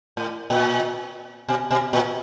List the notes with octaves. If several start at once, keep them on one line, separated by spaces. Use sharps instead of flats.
A2
A#2
B2
B2
A#2